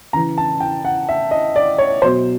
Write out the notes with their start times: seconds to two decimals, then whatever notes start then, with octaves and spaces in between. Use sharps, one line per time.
0.13 C#3 E3 A#5
0.38 A5
0.60 G5
0.85 F#5
1.09 E5
1.31 D#5
1.56 D5
1.78 C#5
2.02 B2 F#3 C5